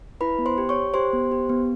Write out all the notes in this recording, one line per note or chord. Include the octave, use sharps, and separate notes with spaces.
E4 B4 B5
B3
C5 C6
G4
C#5 C#6
G4
G4 C5 C6
B3
G4
B3